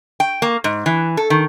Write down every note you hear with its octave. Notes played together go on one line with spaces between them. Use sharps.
G5
A#3
G#2
E3
A4
D#3